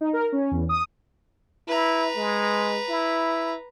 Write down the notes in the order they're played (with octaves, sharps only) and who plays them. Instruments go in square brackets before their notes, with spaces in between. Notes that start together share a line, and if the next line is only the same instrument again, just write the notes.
[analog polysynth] D#4
A#4
C#4
E2
D#6
[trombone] E4 [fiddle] B4 A#5
[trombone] G#3
E4